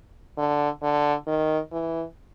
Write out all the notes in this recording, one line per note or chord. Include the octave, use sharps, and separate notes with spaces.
D3
D3
D#3
E3